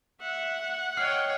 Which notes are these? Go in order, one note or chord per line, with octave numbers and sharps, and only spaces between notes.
E5 F#5
C#5 D#5 G5 F6 C7